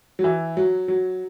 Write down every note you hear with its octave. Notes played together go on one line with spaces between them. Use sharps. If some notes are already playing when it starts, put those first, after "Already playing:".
F#3
E3
F#3
F#3